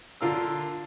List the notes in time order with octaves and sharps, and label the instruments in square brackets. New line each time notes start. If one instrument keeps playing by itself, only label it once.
[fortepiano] D3 F4 A#4 E6